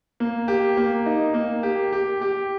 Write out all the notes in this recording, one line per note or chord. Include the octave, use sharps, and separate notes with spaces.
A#3
G4
A#3
D#4
A#3
G4
G4
G4